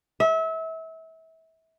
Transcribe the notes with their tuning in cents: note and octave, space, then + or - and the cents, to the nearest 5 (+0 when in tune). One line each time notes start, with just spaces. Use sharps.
E5 -30